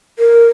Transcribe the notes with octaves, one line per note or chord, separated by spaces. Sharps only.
A#4